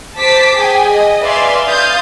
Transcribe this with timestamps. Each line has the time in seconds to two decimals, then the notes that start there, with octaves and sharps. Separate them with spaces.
0.18 C5 A5 D6 B6 C7
0.57 G#4 G5 G#5
0.91 D#5
1.23 B4 D5 E5 F5 G#5 C6
1.67 F5 C6 D#6 G6 A6